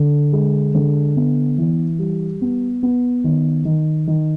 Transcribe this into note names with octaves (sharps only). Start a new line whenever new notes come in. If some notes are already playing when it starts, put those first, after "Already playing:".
Already playing: D3
G#3
D3
B3
E3
G3
B3
B3
D#3
D#3
D#3